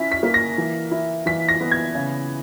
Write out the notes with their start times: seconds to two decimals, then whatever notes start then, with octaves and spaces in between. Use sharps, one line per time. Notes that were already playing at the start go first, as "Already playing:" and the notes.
Already playing: C#4 E4 B6
0.12 B6
0.23 A#3
0.34 A#6
0.58 E3
0.91 E4
1.26 E3 B6
1.49 A#6
1.61 B3
1.72 G#6
1.95 C#3